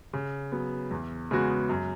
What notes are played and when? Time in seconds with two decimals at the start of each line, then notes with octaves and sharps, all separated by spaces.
0.13 C#3
0.52 F#3 B3
0.91 E2
1.31 C#3 G#3 B3 F#4
1.69 F#2